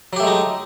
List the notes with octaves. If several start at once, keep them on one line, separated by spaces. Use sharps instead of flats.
F#3 G#3 A3 D#4 G4